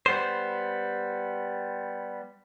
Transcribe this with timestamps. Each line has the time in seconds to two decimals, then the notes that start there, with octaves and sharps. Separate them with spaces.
0.06 G3 B3 C5